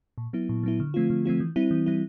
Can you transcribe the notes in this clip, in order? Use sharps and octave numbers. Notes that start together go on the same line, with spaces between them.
A#2
F#3 B3 E4
A#2
F#3 B3 E4
D3
F3 A3 C4 F4
D3
F3 A3 C4 F4
E3
G3 C4 E4
E3
G3 C4 E4